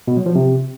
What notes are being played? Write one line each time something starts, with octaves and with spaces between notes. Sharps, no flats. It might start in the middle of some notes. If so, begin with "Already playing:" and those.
B2
F#3
F3
C3